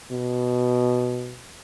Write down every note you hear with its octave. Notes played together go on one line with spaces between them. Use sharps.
B2